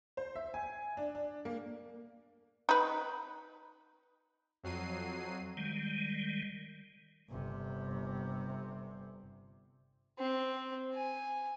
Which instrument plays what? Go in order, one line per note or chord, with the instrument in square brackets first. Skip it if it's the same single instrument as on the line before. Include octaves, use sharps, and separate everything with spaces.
[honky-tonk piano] C5
E5
G#5
D4
D4
A#3
[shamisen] D#4 B4
[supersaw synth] F2 F#3 C7 D#7
[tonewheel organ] D#3 G3 G#3
[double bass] G1 C3
[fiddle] C4
G#5